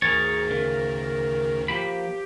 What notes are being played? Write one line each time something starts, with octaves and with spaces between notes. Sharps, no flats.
D2 G#2 D#3 G#4 A#4 C#5 A6
C#3 A#4
F3 A#3 G4 B5